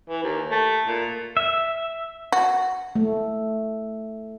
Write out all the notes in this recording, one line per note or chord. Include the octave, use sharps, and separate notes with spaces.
E3
D#2
A3
A#2
E5
F#4
A3